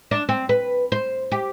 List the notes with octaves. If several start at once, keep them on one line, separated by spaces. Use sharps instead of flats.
D4
C4
B4
C5
G4